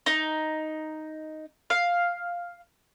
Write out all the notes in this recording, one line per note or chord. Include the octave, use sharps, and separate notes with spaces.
D#4
F5